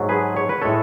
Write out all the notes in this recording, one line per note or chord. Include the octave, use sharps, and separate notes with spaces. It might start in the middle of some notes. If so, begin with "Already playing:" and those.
Already playing: G#2 F#3 A3
G#4 B4
C#5
B4
A2 G#3 A4 C#5